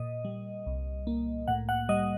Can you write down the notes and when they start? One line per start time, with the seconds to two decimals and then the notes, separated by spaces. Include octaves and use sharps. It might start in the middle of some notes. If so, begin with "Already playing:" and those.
Already playing: A#2 D#5
0.25 G3
0.66 C2
1.07 A#3
1.48 A2 F#5
1.69 F#5
1.89 G3 D#5